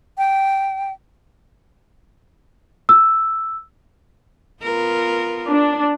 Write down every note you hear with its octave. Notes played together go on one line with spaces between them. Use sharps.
G5
E6
B3 F4 A#4
D4